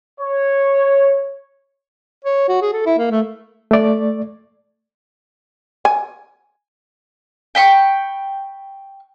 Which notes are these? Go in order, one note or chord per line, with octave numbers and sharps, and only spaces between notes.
C#5
C#5
F#4
G#4
A4
E4
A#3
A3
A3 D5
G#5
G5 B5 C#6